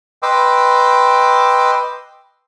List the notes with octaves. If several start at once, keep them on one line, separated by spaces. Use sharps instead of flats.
B4 D#5 G5 C6 D6 E6